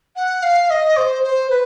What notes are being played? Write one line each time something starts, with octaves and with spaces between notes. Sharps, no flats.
F#5
F5
D#5
C5
C5
B4